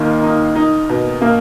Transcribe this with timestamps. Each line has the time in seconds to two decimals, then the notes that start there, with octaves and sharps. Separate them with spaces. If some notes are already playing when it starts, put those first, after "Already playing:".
Already playing: D#2 D#3 A#3
0.23 D#4
0.55 D#4
0.89 B2
1.21 A#3